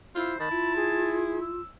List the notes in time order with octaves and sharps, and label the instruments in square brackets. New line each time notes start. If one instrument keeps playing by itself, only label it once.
[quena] E4 [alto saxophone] F4 [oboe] C5
[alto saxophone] D#3 [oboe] A5 [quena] B5
[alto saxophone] E4 [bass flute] F4
[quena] G#4
[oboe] E6